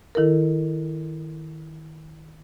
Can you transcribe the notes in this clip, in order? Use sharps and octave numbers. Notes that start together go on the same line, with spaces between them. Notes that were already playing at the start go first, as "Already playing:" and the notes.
D#3 E4 A4 A#4